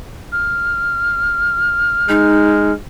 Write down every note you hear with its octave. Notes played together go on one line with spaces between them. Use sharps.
F6
G#3 D#4